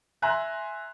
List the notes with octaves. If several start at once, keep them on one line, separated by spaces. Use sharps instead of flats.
E5 G#5 A#5 C6 F#6